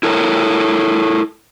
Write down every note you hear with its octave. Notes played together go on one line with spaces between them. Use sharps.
E4 A4 A#4 C#5